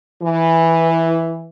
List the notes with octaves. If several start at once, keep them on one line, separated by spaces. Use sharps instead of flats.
E3